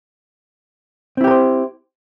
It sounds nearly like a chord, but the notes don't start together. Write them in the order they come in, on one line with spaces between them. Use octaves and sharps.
C4 E4 G4 A#4 C5